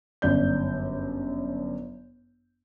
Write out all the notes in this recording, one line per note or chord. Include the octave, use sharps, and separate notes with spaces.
G1 F#2 D5 G6